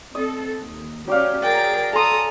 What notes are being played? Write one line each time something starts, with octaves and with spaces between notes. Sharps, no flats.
C4 A4 D#5
D#2
F#3 C#4 G4 D5 F5
G#4 A#4 G5 A6
A4 G#5 A#5 C6 D#6